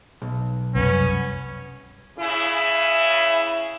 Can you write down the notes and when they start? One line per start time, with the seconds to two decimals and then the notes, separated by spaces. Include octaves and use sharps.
0.22 B1
0.75 C2 F#2 B3 C#4
2.19 C#3 E4